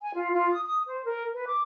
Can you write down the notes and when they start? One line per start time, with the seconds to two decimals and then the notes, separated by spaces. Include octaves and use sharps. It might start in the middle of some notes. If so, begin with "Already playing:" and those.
0.02 G#5
0.14 F4
0.33 F4
0.52 D#6
0.65 D#6
0.86 C5
1.04 A#4
1.34 B4
1.46 D6